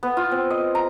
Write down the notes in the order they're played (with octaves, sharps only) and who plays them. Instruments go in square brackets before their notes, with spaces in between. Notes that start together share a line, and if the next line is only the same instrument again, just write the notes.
[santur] B3
F4
C4
D#5
A#5